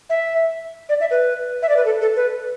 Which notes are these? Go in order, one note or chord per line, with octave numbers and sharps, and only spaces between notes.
E5
D5
E5
B4
E5
D5
B4
A4
A4
B4